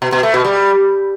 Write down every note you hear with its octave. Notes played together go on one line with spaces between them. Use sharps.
B2
B2
A3
B2
G3